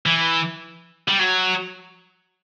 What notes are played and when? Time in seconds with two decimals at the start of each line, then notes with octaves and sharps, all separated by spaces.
0.06 E3
1.08 G3
1.19 F#3